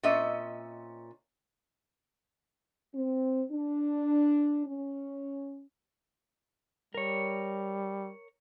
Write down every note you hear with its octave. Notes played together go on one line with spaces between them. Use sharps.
A#2 C4 C#4 D#5 E5
C4
D4
C#4
G3 A#4 C#5